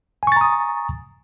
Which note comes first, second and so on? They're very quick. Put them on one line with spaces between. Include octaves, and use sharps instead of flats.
G#5 C#6 A6 A#5 D#6